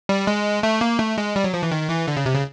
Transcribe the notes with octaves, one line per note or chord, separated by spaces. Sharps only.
G3
G#3
A3
A#3
A3
G#3
G3
F#3
F3
E3
D#3
E3
D3
C#3
C3
C#3